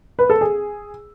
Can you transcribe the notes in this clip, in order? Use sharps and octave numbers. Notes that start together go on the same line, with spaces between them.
B4
A4
G#4